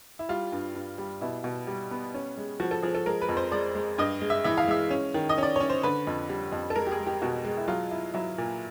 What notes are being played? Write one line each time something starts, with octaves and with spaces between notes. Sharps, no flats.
E4
G3 F4
G2
G2
G3
B2 E4
B2
G3
B3
C#4
G#3
F3 F#4
A4
F3 G#4
A4
G#3 A#4
B4
F2
C5
G#3 D5
G#3
G2 D#5
G#3
E5
E3 E5
F5
G#3 E5
C#4
D#3
D#5
C#4 D5
C#4 C#5
C5
D3 B4
F2
G3
F2
A4
G#3 A#4
G4
G#4
G#3
G4
B2 F#4
G#3
E4
F#3 F4
E4
F#3 E4
A#2